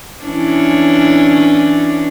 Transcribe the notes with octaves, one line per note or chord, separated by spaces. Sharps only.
E3 C#4 D4